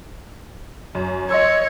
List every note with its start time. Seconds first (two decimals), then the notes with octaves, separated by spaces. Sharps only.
0.95 F#2
1.30 C#5 D#5 C6 E6